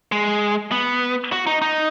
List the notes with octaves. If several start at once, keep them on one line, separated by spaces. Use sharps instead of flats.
G#3
B3
F#4
D#4
D#4